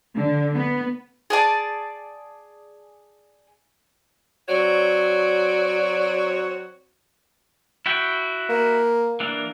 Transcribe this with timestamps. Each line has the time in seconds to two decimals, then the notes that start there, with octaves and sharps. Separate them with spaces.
0.15 D3
0.55 B3
1.30 G#4 D5 A5
4.48 F#3 C4 F#4 C#5 D5
7.86 E4 F#4 G5
8.49 A#3
9.20 E3 A#3 D4